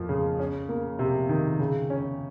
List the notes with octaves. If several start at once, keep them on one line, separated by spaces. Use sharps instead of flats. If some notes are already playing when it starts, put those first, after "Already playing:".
Already playing: F2 F3 A#3
C#3
C#4
A#3
C3
D#3
C#3
C#4